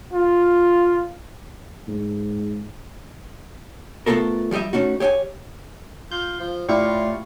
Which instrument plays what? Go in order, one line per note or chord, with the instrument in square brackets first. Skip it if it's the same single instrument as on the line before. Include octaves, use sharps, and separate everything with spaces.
[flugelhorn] F4
[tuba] G#2
[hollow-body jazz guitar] A3 B3 F4 A4 A#4
F3 G3 G4 D#5 E5
A3 C#4 D#4 F#4
G4 C#5 E5 G5 G#5
[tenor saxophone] F4 [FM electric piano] G6
[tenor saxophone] F3
[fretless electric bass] A2 [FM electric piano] E4 G4 C#6 [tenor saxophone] F4 [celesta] D5